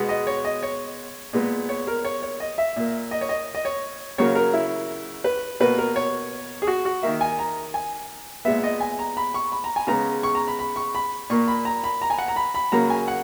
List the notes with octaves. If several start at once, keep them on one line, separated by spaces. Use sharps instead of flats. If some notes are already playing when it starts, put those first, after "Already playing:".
Already playing: B2 G#3 B3
D#5
C#5
D#5
C#5
A#2 G#3 B3
C#5
A#4
C#5
C#5
D#5
E5
A#2 A#3
D#5
C#5
D#5
D#5
C#5
C#3 F#3 A#3 C#5
A#4
E4
B4
B2 A#3 B4
A#4
C#5
G#4
F#4
F#4
D#3 A#3 E5
G#5
A#5
G#5
A#2 G#3 B3 E5
D#5
G#5
A#5
B5
C#6
B5
A#5
G#5
C#3 G#3 B3 A#5
C#6
A#5
B5
B5
C#6
B5
A#2 A#3 C#6
B5
A#5
B5
A#5
G#5
F#5
A#5
B5
B5
C#3 F#3 A#3 A#5
G#5
F#5